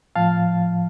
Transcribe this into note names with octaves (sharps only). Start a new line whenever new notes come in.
A2 F3 F5 A5